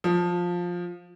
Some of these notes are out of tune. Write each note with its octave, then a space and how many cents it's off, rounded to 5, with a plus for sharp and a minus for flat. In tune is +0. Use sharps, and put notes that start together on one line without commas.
F3 +10